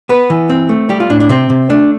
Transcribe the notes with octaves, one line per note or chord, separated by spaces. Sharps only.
B3 B4
E3
C4
A3
G3 G4
F4
A2 D4
D4
C3 C4
C3
A3 D4